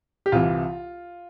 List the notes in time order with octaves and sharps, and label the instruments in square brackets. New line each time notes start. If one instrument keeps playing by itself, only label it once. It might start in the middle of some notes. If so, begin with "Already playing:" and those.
[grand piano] G4
C2 C3 E3 F4